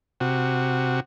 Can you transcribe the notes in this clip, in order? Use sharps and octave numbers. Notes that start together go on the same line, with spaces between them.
C3 F#4